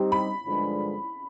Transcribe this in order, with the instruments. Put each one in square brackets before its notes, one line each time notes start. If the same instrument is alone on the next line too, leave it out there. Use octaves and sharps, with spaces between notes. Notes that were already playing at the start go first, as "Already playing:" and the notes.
Already playing: [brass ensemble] G3 C4 D#4 G4
[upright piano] B5
[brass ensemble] G2 D3 F3 G#3